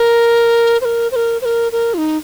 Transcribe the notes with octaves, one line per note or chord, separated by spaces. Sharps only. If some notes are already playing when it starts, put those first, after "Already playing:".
Already playing: A#4
C5
A#4
C5
A#4
C5
A#4
A#4
F4
D#4